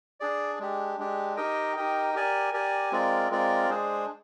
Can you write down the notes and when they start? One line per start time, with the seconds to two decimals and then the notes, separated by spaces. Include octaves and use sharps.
0.20 D4 G#4 D5
0.59 G#3 D4 G4
0.99 G#3 D4 G4
1.37 D#4 G4 A#4 D#5 G5
1.76 D#4 G4 A#4 D#5 G5
2.14 G4 A#4 D5 G#5
2.54 G4 A#4 D5 G#5
2.92 G#3 C4 F4 A#4 D5
3.31 G#3 C4 F4 A#4 D5
3.70 G#3 D4 G#4 C5